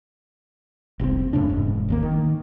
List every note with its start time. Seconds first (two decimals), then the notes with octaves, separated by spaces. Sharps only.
1.00 F1 C2 A#2 C4
1.33 F#2 A2 C#3 D4
1.49 E1 G#2
1.89 G#1 D#2 A#3
2.03 D#3